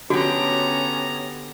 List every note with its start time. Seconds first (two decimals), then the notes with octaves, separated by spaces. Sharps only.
0.10 D3 B3 C#4 F#4 G4 A#5